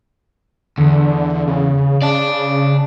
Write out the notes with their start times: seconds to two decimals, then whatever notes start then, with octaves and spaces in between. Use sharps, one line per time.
0.78 E2 D3
1.47 C#3
2.02 C#3 D5 A5